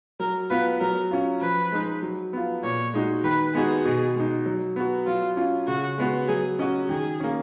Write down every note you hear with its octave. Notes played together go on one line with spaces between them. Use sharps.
F#3 A#4
B3 F4 B4
F#3 A#4
C#4 F4
F3 B4
G#3 D#4
F#3
B3 F4
A#2 C#5
G#3 D#4 F#4
D#3 B4
G#3 B3 D#4 F#4 G#4
B2
G#3 D#4
F#3
B3 F#4
F#3 F4
C#4 F4
C#3 F#4
G#3 B3 F#4
F#3 G#4
C#4 F#4 D#5
D#3 G#4
A#3 C#4